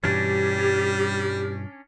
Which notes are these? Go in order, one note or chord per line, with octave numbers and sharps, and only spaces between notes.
G2 B2 E3 G3 C#4 D4 G4